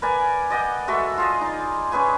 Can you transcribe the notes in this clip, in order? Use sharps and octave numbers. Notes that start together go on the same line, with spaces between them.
A#4 B4 D5 G#5
D5 D#5 F#5 G5
G#3 F#4 A4 E5
F4 G#4 D#5
D#4 D5
C#4 G#4 B4 G#5